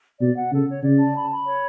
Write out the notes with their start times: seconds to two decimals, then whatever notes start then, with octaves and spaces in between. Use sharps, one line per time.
0.20 B2 D5
0.36 F#5
0.52 C#3 A4
0.68 C#5
0.83 C#3 D5
1.00 A5
1.15 B5
1.31 B5
1.46 C#5